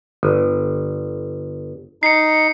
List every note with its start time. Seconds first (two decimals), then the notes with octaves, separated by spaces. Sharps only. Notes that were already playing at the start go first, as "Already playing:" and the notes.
0.23 G1
2.03 D#4 C7 C#7